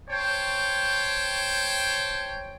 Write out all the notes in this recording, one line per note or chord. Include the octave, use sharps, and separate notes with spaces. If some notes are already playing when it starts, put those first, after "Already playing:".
C5 C#5 G5 A5